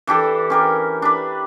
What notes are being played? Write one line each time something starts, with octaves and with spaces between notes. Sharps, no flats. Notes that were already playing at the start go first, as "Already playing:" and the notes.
E3 D4 G4 A4
C#4 G4 A#4
D4 B4